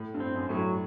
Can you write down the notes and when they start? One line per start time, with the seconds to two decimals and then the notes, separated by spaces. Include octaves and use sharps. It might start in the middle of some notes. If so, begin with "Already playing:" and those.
Already playing: A2
0.14 G2
0.20 C4
0.35 F#2
0.49 A2 F#3
0.56 G2